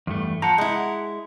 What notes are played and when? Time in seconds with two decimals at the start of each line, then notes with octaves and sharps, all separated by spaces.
0.07 E2 G2 A3
0.42 F3 F#5 A#5
0.58 G#3 E4